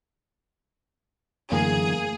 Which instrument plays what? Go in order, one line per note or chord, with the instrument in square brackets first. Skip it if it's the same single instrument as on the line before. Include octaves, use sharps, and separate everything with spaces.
[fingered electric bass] F#2 D3 E3 [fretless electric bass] A3 A#3 [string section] G#4